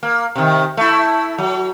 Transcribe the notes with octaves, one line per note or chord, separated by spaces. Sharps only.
A#3
C3 D#3
A3 E4
F#3